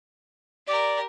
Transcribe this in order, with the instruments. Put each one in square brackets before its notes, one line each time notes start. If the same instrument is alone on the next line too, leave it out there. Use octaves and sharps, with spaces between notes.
[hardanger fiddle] G4 A#4 [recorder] D5